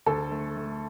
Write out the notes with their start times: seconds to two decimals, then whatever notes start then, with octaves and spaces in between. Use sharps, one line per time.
0.06 D2 A4
0.32 A3
0.57 A3